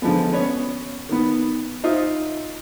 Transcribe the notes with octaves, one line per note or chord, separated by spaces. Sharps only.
D3 F3 G#3 B3
B3 C#4 C#5
D#3 B3
D#4 F4 C5 D#5 E5